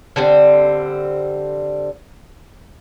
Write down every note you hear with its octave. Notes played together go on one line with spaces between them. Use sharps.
D3 G3 C4